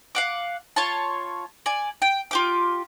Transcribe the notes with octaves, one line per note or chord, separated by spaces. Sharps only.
F5 F#5 D6
F4 C#5 A5
D5 G#5
G5
F4 G4 D6